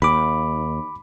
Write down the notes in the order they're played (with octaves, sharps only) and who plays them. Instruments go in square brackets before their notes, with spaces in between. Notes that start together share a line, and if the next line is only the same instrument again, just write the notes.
[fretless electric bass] D#2 [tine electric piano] B5 D6